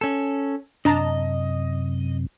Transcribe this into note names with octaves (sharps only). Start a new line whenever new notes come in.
C#4 A4
F#2 C3 D4 D#5 A5 A#5